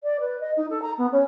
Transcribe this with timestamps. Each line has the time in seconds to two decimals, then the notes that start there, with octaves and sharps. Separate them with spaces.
0.03 D5
0.20 B4
0.40 D#5
0.57 D#4
0.70 A4
0.82 A#5
0.98 B3
1.12 C#4